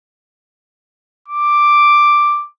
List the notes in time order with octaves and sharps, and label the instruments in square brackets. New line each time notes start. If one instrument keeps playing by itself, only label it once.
[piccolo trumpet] D6